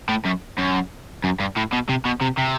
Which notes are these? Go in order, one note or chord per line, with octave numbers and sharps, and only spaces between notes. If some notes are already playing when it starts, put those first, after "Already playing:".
A2
F#2
F#2
F#2
G2
A2
B2
C3
B2
C3
C3